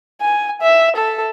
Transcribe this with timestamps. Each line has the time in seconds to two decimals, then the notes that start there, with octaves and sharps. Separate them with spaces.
0.22 G#5
0.62 E5
0.96 A4